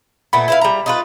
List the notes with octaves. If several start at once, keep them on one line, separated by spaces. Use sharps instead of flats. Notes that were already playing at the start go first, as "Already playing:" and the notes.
A#2 A3 B3 B5
E4 B4 F5
G3 A#5
D#4 F4 B4